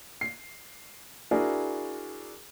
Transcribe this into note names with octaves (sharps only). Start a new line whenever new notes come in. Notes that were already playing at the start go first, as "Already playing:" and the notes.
C7
D4 E4 F#4 G#4 A#4